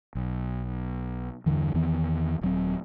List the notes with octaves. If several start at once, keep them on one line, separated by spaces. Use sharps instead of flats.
B1
E2 G2 D3 E3
E2 D#3 E3 B3
D#1 F#3 C4